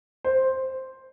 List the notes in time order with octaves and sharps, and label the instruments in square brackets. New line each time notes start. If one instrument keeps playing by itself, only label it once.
[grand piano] C5